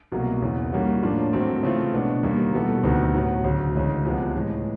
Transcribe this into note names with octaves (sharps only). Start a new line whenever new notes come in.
C2 B2 F#3 A#3
E2 C#3 E3
D#3 G3 A#3 C#4 F#4
A2 F3 A#3 D4 F4
G#2 D#3 F#3 A3 C4
C#3 E3 A3 C4 F4
B2 G#3 B3 D4
D#2 D#3 G3 A#3
B2 G3 B3 E4 A4
D2 C3 D#3 F#3 B3
A2 F#3 B3
D2 C#3 F#3
D2 C#3 E3 G#3
C#2 C3 F3 G#3 B3
A2 E3 G#3